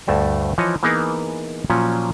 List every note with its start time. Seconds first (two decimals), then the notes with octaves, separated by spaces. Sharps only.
0.07 D2 G2 A3 A5
0.58 E3 F3 C#5 D#5
0.83 E3 A#3 B3 D#4 G#4 A#4
1.70 A#2 F3 F#3 C#4